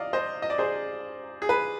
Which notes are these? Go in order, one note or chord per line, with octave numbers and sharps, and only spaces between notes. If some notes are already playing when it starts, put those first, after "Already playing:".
Already playing: D5 D#5 F5
C5 D#5
D#5
D5
G#4 C5
G#4
B4